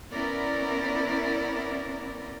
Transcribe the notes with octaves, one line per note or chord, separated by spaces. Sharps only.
B3 C#4 E4 A#4 D5